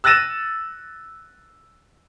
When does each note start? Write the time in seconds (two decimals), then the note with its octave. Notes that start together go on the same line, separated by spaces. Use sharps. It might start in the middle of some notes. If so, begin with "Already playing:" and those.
0.04 E6 F#6 A6 A#6 D#7 E7